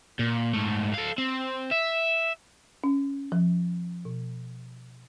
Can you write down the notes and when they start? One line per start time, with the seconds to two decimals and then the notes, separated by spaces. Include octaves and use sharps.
0.19 A#2
0.54 G#2 A3
0.94 A4 F5
1.18 C4
1.71 E5
2.84 C#4
3.32 F3
4.05 B2